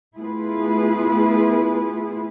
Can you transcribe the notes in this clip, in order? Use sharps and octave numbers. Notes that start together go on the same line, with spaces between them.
A3 B3 E4 F4 G#4 B4